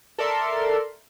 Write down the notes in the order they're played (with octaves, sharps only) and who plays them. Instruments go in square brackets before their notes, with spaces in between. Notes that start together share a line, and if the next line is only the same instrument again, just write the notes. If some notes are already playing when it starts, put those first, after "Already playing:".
[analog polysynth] A4 A#4 D5 E5 C6